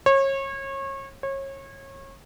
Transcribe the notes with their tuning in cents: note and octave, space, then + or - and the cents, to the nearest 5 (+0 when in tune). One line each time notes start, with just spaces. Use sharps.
C#5 -30
C#5 -30